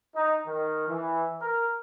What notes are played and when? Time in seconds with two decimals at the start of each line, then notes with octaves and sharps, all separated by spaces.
0.15 D#4
0.47 D#3
0.88 E3
1.41 A#4